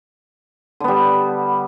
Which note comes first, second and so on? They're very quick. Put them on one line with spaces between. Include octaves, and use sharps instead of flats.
D3 B3 G3